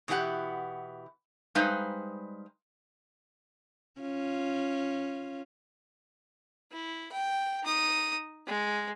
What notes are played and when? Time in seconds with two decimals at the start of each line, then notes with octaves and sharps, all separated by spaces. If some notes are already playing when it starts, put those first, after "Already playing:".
0.08 B2 E3 B3 G4 F#5
1.55 G3 G#3 D#4 B4 C5 F5
4.01 C#4 F4
6.72 E4
7.12 G5
7.63 D#4 D#6
8.47 G#3